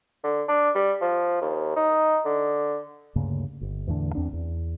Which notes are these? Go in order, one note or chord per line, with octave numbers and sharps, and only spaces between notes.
D3
D4
G3
F3
D#2
D#4
D3
D2 G2 C#3 A#3
G1
E2 A2 D3
E2 C4 D4
E2